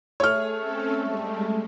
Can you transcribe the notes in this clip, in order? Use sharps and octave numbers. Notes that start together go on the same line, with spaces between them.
A3 G#4 C#5 F6
C4 C#4 A4
G3 G#3